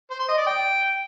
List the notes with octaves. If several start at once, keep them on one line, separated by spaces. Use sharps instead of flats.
C5
C6
D#5
D5
G5